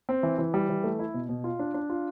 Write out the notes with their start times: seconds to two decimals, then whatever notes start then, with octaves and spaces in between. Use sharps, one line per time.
0.09 C4
0.23 E3
0.38 E3
0.54 G3
0.69 E3
0.84 A3
0.99 E4
1.14 B2
1.29 B2
1.44 F4
1.59 D4
1.74 D4
1.90 F4